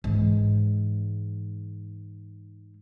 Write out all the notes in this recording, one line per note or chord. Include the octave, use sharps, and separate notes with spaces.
G#2 E3